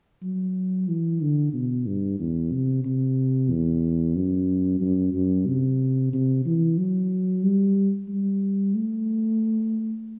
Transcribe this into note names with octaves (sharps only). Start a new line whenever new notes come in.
F#3
E3
D3
B2
G2
E2
C3
C3
E2
F#2
F#2
F#2
C3
C3
E3
F#3
G3
G3
A3